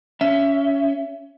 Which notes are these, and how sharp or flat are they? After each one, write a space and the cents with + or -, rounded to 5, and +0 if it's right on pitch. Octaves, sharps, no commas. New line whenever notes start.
C#4 +20 E5 +20